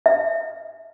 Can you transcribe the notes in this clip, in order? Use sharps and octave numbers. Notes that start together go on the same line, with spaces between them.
E5